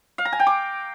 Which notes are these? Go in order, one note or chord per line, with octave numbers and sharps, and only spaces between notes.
F5
A#5
G#5
G5
D6